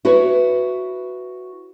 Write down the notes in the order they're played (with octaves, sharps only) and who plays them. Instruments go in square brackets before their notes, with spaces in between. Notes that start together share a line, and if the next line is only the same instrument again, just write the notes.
[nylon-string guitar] E4 F#4 B4 C#5